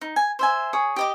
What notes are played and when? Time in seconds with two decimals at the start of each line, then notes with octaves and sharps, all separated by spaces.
0.01 D#4
0.16 G#5
0.39 C5 E5 G#5
0.73 G#4 C#5 D#6
0.96 G4 D#5 D6